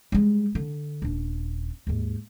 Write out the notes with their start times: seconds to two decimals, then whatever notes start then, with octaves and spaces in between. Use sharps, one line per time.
0.12 G3 G#3
0.55 D3
1.02 D#1 D4
1.87 D#2 G#2